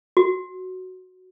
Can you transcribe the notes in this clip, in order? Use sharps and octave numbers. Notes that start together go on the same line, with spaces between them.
F#4